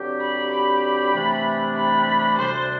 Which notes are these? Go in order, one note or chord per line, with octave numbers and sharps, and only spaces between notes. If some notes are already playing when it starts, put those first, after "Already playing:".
Already playing: G2 D3 F#3 C4 G4
B5
B5
C3 E3 A3 D4
B5
D2 C3 G3 D4 C5